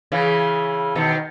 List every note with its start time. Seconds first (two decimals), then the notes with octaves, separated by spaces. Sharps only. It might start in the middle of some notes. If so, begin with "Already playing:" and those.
0.12 C#3 E3
0.95 B2 D#3